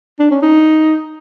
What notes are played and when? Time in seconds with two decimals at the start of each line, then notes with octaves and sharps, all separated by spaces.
0.20 D4
0.31 C#4
0.42 D#4